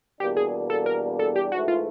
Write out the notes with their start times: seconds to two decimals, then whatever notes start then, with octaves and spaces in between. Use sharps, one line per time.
0.20 E2 B2 G3 A#3 D4 G4
0.37 G#4
0.70 A4
0.86 A#4
1.19 A4
1.36 G4
1.52 G#2 E3 A3 F#4
1.68 F4